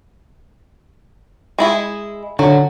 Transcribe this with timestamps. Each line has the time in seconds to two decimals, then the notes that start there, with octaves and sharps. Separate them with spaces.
1.59 G#3 E4 G#4
2.39 D3 F#3